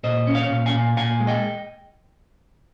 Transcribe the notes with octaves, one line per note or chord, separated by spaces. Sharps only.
A#2 C5 D#5
C#4
C#5 F5
A#2
F5 G#5
A#2
A#2 F5 G#5
G#3
D#5 G5